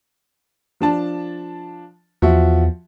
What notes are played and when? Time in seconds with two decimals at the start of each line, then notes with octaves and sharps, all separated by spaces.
0.81 F3 D4 A5
2.22 E2 F3 F#4 E5